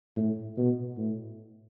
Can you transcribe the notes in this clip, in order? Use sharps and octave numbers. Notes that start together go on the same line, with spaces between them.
A2
B2
A2